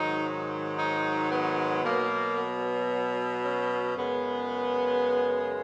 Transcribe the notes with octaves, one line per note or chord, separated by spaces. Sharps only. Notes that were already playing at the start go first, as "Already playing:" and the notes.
Already playing: G#2 D#3 F#3 D#4
D#4
B3
B2 F#3 A#3
B3
C#4
F#2 C#3 G#3 B3